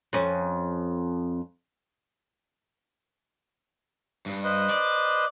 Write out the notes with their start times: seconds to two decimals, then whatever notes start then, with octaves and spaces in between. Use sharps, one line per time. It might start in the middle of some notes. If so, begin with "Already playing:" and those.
0.13 F2 C#4
4.26 G2
4.44 B4 C5 D#5
4.70 D5